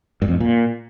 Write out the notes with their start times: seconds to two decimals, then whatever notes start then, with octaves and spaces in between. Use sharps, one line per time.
0.22 G2
0.28 F2
0.34 A2
0.40 A#2